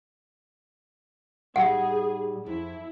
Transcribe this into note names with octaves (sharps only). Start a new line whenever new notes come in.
A2 G3 D#4 G#4 F#5
F2 E4